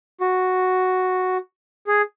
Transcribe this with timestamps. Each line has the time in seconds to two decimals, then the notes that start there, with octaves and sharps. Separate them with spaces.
0.21 F#4
1.87 G#4